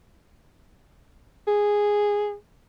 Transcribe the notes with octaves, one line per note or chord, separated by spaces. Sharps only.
G#4